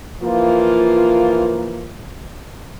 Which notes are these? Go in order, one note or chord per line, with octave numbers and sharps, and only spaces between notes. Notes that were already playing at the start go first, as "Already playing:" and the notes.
E3 F3 A#3 F4